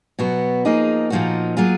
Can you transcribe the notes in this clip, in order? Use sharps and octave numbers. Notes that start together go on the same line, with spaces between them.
B2 F#3 B3 F#4
F3 A#3 D#4 G#4
A#2 F3 A#3 D#4 F#4
F#3 A#3 F4 G#4